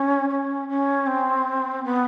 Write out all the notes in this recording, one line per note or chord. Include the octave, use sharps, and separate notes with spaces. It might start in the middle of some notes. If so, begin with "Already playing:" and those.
Already playing: C#4
C#4
C#4
C4
B3